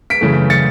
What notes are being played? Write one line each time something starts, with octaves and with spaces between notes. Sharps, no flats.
B6 D7
F#2 C#3 E3 A3
A6 C#7